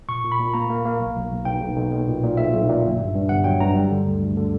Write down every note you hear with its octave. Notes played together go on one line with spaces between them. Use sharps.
A#2 C#6
A#2
B5
A#2
A#3 A#5
A#3
A#3
B1
B1
B1
B1 G5
B1
B1
B1
A#2
A#2
B1 E5
B1
A#2
G1
G2
G2
G1 F#5
F#3 G5
G2 A#5
G3
D3
D2
D2
D3